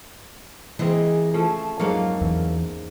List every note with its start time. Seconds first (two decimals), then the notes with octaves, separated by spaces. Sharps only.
0.79 C#3 E3 G#3 A#3 C4 G#4 D#5
1.34 F3 A3 C#4 A5
1.80 F2 G#2 F#3 A#3 A#4 C#5 F5
2.21 E2 E3